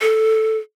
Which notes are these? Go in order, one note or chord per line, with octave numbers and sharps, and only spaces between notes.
A4